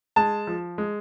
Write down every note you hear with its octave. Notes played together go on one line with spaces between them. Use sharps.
G#3 A5
F3
G#3